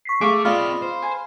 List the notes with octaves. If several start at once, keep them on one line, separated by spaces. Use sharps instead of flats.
C#6 B6 C7
A3 G#4 F5 C#6 D6
C4 F4 D5 D#5 F5 B5 F6
C5
G#5